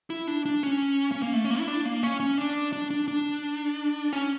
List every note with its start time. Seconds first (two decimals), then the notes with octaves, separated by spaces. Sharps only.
0.10 E4
0.28 D4
0.46 D4
0.63 C#4
1.12 C#4
1.23 A#3
1.33 A3
1.44 C#4
1.50 A#3
1.60 E4
1.68 D4
1.85 A#3
2.03 C#4
2.20 C#4
2.38 D4
2.73 D4
2.91 D4
3.08 D4
4.13 C#4